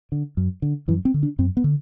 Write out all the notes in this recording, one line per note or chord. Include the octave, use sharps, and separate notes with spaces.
D3
F#2
D3
F#2 E3
C4
D3
D4
F#2 C4
B3
D3